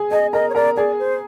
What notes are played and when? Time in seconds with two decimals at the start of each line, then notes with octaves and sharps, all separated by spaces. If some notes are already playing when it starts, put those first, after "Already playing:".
Already playing: G#4 G#5
0.11 G#4 D#5 G#5
0.33 A#4 D#5 A#5
0.50 C#5
0.55 A#4 D5 A#5
0.77 G#4 D5 G#5
0.99 C5